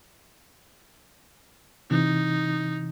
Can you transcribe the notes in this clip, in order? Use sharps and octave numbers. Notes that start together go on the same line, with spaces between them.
C3 E3 D#4